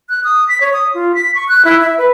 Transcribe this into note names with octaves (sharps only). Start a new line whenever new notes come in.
F#6
D#6
B6
C#5
D#6
F4
B6
C#6
F#6
E4
E5
B4